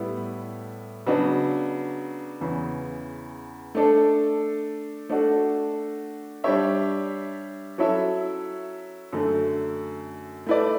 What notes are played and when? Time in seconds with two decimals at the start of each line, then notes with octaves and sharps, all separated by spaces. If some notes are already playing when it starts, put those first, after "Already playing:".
Already playing: A2 G3 B3 E4
1.07 C#3 F#3 B3 D4
2.41 E2 C#3 E3
3.75 A3 D4 A4
5.09 A3 D4 F#4 A4
6.44 G3 D4 G4 C#5 E5
7.78 F#3 C#4 E4 A4 E5
9.13 F#2 D3 A3
10.46 A3 E4 B4 D5